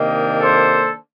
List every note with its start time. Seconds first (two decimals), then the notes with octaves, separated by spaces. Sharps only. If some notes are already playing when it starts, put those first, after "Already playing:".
Already playing: C3 D#3 A#3 D4 D#5 G5
0.41 A4 C5